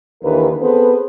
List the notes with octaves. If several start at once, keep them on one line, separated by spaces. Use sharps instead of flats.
D#2 D3 E3 A#4 B4
B3 C4 G#4 A4 B4 C5